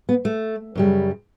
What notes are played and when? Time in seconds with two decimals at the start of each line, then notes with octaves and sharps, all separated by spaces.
0.09 B3
0.25 A3
0.75 F#2 C#3 G3